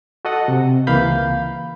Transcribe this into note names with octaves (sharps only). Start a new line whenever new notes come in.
F#4 A4 D#5 F#5
C3
C#2 E3 A#3 F5 B5 G6